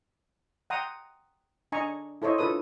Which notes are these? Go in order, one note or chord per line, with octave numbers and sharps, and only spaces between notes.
F#5 G5 A#5 C6 D#6
D4 D#5 G#5 A#5 C#6
E4 A4 C5 C#5 D#5
D4 F4 A4 B4 D#6